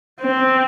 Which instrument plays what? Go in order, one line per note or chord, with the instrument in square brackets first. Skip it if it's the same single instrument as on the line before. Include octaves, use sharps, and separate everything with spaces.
[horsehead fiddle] C4